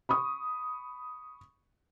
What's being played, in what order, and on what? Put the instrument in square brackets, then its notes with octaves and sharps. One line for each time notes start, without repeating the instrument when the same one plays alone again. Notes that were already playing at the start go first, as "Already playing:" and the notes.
[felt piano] B5 C#6 D#6